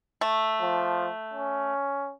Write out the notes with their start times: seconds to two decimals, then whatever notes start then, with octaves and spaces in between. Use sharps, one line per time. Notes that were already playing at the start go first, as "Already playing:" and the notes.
0.21 A3
0.61 F3
1.33 C#4